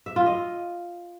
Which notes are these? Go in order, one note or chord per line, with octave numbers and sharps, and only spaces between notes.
E5
F4
D#5